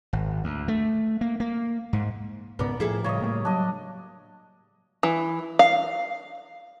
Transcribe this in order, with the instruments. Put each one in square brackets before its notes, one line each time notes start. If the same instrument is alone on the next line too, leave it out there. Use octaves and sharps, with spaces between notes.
[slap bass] G#1
D2
A3
A#3
A#3
G#2
[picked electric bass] C#2 G#2 B2 [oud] B3 [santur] A#4 D5
[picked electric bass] A2 F3 [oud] E4 G#4 A4
[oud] C#3 G3 [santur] C#5 D#5
[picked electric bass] A2 A3 A#3
[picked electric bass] F#3 [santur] D4 D#5
[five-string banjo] E3
F5